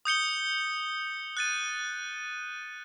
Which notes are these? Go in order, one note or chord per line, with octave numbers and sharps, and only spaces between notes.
D#6 G6 C#7 G7
F#6 A6 D#7